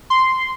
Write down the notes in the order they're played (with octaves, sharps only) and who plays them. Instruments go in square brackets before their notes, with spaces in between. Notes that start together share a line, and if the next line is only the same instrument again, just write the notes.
[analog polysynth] C6